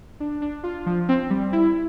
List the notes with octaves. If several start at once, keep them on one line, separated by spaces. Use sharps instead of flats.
D4
D4
F4
F3
C4
G3
E4